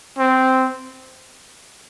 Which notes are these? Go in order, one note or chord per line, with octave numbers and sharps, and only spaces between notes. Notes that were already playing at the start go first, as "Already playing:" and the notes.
C4